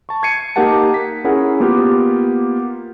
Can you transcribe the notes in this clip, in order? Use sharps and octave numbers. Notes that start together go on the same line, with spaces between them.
A5 C#6
G#6 C7 C#7 D#7
A#3 D#4 G4 A#4 F#5 A5
B6
C#4 E4 G#4 A#4 F#5
A#3 B3 F4 G4